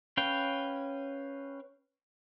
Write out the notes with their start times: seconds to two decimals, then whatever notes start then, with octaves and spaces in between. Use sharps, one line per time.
0.17 C#4 B4 F5 G5